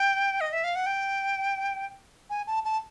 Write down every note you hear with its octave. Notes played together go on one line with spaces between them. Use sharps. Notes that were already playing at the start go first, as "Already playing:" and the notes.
Already playing: G5
D#5
E5
F5
F#5
G5
G#5
A5
A5